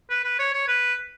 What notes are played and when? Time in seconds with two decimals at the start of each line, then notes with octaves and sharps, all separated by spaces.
0.10 B4
0.24 B4
0.39 C#5
0.53 C#5
0.68 B4